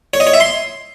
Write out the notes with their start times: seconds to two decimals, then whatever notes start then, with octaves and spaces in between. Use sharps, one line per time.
0.14 C#5
0.20 D#5
0.27 C#5
0.34 E5
0.40 C6